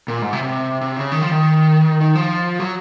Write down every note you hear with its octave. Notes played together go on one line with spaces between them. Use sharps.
A#2
G#2
C3
C3
C3
C#3
D#3
F3
D#3
D#3
F3
F#3